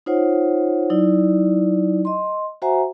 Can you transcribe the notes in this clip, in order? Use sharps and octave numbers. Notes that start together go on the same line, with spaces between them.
D#4 F4 C5 C#5 F#5
F#3 D#4 E4 D5
D#5 C6
F#4 C5 E5 F#5 G#5 A#5